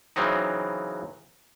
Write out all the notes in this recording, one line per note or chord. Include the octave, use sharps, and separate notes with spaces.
C#3 E3 F#3 C4 D#4